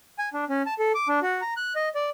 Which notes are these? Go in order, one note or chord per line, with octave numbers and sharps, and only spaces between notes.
G#5
D4
C#4
A5
A4
D6
D4
F#4
A#5
F#6
D#5
D5